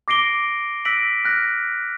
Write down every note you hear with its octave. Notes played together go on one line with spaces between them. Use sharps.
D6 A#6 C7 D7 G7
E6 F#6 A#6 B6 D7 F#7
F6 F#6 A#6